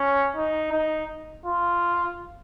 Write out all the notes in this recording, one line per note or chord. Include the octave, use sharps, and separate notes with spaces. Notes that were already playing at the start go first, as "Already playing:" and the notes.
Already playing: C#4
D#4
D#4
F4